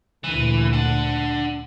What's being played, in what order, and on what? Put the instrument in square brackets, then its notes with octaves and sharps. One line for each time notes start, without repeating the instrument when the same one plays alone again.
[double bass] D2 A#2 [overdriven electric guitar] E3
[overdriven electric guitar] D4 F#5